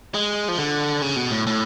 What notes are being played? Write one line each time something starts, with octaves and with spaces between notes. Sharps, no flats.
G#3
F3
D3
C#3
B2
A2
A2